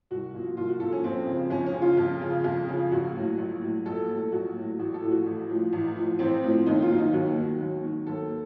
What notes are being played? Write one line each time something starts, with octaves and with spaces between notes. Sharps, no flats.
C2 F#4
A#2 F3
C2 F4
F#4
A#2 F3 A4
C#4
F2 C4
C#3 F3
F2 C#4
C#4
C#3 F3
F4
F2
C#3 F3
F2
C#3 F3
A#1 F#4
A2 F#3
A#1
A2 F#3
A#1 A4
A2 F#3
A#1 F#4
A2 F#3
A1 F#4
A4
A2 F3
F#4
A1
A2 F3
A1
A2 F3
A1 C4
A2 F3
D#2 D#4
F4
D#3 F#3
D#4
D#2 F#4
D#3 F#3
D#2
D#3 F#3
D#2 A4